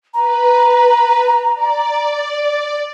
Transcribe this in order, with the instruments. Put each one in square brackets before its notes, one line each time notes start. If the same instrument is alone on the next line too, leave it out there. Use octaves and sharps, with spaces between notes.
[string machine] B4 [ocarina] A#5
[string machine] D5